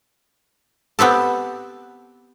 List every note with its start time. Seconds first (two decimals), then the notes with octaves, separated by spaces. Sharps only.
0.99 B3 C4 G4 A4